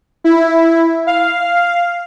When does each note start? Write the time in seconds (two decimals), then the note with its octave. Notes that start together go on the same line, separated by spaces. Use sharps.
0.24 E4
1.07 F5